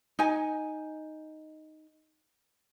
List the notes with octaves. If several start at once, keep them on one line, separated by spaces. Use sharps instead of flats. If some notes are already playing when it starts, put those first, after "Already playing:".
D#4 G#5